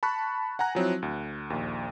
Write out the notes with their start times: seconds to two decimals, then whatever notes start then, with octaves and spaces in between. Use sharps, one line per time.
0.03 A5 B5 C#6 F#6
0.59 F#5 G#5 A#5 F#6
0.75 F3 F#3 C4 E4
1.02 D2
1.50 A#1 D#2